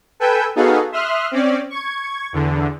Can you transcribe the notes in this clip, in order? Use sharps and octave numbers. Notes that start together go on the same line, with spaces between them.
A4 B4 G5 G#5 E6 G6
B3 D#4 F#4 G#4 A4 F5
E5 C6 D#6 F6 F#6
C4 C#4 D5
C#6 G#6
E2 D3